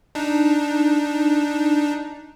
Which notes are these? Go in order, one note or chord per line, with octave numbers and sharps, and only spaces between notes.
D4 D#4